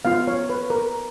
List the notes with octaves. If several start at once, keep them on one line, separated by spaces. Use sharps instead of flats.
B3 F4 F5
C#5
B4
A#4